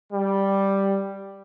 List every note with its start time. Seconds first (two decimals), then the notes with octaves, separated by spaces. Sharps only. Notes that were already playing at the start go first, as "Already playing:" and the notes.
0.12 G3